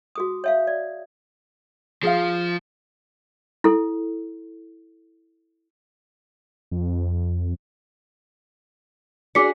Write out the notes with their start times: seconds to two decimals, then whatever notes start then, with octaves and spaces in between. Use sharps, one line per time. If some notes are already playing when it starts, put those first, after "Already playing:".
0.15 F#4 G#4 D#6
0.44 C#5 E5 F5
0.67 D5
2.03 F3 F4 G#4 F5
3.64 E4 A4
6.71 F2
9.35 D4 F#4 G#4 D6 B6 C#7